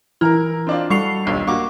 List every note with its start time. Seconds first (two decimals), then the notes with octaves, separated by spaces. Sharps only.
0.21 E3 E4 A#4 A#5 F6
0.67 C4 D4 F4
0.90 G3 F#4 A4 C#6 C7 F7
1.25 D#1 B1 G2
1.47 G2 A#3 F#4 C#6 D6